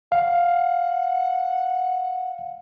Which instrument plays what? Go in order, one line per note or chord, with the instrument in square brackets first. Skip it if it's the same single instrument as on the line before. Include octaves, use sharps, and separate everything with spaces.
[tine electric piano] F5 [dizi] F#5